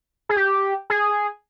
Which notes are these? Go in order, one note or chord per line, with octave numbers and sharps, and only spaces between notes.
G#4
G4
G#4